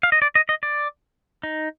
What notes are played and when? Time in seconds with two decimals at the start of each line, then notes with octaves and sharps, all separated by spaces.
0.03 F5
0.12 D#5
0.22 D5
0.35 D#5
0.49 D#5
0.63 D5
1.43 D#4